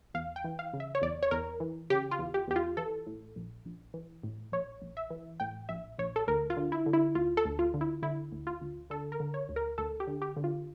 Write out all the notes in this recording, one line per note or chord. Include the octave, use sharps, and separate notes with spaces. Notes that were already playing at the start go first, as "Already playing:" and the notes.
E2 F5
G5
E3
F5
C#3
E5
C#5
E2 D5
C#5
E2 A#4
E3
C#3 G4
F4
E2
G4
E2 G4
F4
E3 A4
A2
A#1
A#1
E3
A2
A#1 C#5
A#1
E5
E3
A2 G5
A#1 E5
A#1 C#5
A4
D2 A#4
F4
D3
E4
D3
E4
D2 F4
A4
D2
F4
D3
E4
D3 E4
D2
F4
D2
D3 A4
A#4
D3
C#5
D2
A#4
D2 A4
G4
D3
G4
D3
F4